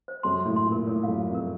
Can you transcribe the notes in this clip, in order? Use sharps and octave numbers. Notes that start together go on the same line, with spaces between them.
C5
F#2 C6
C6
A2
C6
A#2
A#4
A2 A#4
F#2 F5
F5
F2
A#4